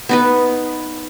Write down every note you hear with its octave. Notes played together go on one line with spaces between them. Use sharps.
B3 D#4 B4